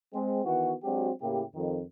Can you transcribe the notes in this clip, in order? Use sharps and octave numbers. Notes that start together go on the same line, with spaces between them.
G#3 C4
D#3 E3 B3 F#4
F#3 G#3 C4 D4 F#4 G4
A2 C#3 A#3 E4 G4
F2 D#3